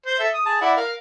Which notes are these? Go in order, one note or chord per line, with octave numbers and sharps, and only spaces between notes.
C5
A4 E5
D#6
G#4 A5
E4 D5 F#5
A#4 F5